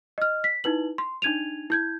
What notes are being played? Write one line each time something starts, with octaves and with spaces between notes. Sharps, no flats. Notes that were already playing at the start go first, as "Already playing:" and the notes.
D#5 F6
B6
D#4 E4 B4 F#7
C6
D4 D#4 G#6 D#7 F7
E4 G6 G#6